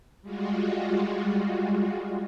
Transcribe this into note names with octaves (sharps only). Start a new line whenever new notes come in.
G3 G#3 F4 F#4